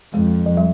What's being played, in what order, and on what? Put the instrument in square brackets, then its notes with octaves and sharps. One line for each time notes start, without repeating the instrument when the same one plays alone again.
[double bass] F2 [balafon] G#3
[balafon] F3
G3